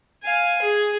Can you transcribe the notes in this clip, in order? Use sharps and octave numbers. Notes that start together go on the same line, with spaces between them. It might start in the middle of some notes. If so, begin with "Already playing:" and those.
F5 G#5
G#4